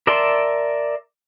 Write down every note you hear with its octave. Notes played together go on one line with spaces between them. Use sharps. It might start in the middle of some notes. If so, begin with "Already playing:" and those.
A#4 D5 E5 A5 C6